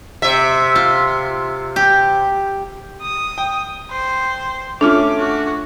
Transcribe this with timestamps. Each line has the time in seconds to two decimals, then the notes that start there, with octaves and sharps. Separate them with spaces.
0.22 C3 E5
0.75 F4
1.76 G4
3.02 D#6
3.38 G5
3.91 C5
4.81 A3 C#4 D4 F4 D6 F6
5.19 F#4